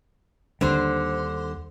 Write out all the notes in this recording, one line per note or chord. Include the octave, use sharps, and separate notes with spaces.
D#2 D3 G3 C5